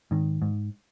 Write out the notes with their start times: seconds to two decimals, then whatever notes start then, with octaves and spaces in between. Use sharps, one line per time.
0.11 G#2 D#3
0.42 G#2